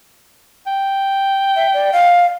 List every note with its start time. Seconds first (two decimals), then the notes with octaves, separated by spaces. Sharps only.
0.67 G5
1.56 E5
1.74 D5
1.93 F5